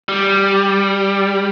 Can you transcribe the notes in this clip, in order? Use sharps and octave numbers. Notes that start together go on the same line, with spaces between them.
G3